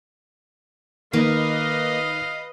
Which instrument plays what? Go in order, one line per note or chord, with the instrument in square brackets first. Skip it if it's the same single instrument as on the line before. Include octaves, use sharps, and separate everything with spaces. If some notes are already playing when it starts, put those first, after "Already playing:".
[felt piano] D#3 [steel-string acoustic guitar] A#3 [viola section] B4 D#5 [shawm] F5